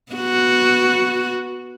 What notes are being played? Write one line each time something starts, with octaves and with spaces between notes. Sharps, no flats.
B3 F#4